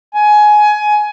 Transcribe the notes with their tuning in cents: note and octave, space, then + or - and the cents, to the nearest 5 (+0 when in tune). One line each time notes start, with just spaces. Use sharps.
G#5 +20